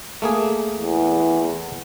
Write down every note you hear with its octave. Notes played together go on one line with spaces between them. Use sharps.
A3 A#3 G#4
E2